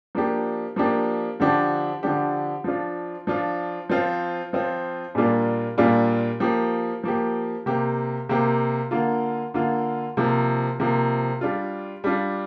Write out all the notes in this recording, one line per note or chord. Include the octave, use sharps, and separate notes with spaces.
F3 A#3 D4 G4
F3 A#3 D4 G4
D3 F3 D4 G4
D3 F3 D4 G4
F3 D4 F4
F3 D4 F4
F3 C4 F4
F3 C4 F4
A#2 G3 A#3 D4 F4
A#2 G3 A#3 D4 F4
F3 A#3 G4
F3 A#3 G4
C3 A#3 G4
C3 A#3 G4
D3 A#3 F4
D3 A#3 F4
C3 F3 A#3
C3 F3 A#3
G3 D4 F4
G3 D4 F4